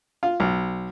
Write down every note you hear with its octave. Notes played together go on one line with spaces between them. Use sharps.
F4
B1